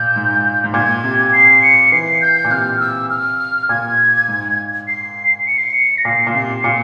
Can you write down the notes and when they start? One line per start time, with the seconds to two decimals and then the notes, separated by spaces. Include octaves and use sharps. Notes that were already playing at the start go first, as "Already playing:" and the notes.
Already playing: A#2 G6
0.16 G#2
0.64 G#2
0.74 A#2 G#6
1.04 C3
1.33 C7
1.62 C#7
1.92 E3 C7
2.22 G6
2.44 A#2
2.51 C3 F6
2.80 E6
3.10 F6
3.69 A#2 G#6
4.28 G#2
4.87 C7
5.47 C#7
5.58 C7
5.71 C#7
5.98 A#6
6.05 A#2 C7
6.27 A#2
6.35 C3 C7
6.64 A#2 C#7